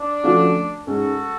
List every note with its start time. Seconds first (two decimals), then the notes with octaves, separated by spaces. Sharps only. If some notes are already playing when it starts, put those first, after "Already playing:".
Already playing: D4
0.24 D3 F3 A3 C#4 F#4
0.86 G#2 G#3 C#4 F#4 A4